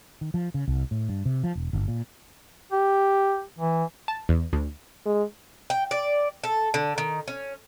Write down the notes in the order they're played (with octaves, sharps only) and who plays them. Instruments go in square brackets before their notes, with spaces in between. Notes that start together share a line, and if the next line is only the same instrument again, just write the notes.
[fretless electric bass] D#3
F3
C#3
C2
A2
G2
C3
F3
E1
G1
A#2
[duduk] G4
E3
[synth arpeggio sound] A5
E2
D2
[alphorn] G#3
[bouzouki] G5
D5
A4
D3
D#3
C#4